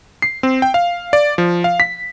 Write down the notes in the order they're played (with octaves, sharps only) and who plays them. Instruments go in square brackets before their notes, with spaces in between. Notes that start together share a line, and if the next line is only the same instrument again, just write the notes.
[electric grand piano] C7
C4
G5
F5
D5
F3
F5
B6